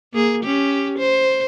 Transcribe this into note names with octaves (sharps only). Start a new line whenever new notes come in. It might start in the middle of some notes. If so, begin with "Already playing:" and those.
A#3 G#4
C#4 G4
C5